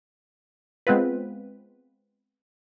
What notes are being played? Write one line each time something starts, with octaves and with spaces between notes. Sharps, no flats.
G#3 B3 C4 F4 B4